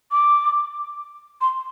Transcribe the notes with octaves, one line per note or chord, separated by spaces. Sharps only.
D6
C6